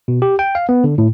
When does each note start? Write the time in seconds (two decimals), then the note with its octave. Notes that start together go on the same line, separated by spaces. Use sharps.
0.08 B2
0.22 G4
0.39 G5
0.55 F5
0.69 B3
0.84 D3
0.98 A2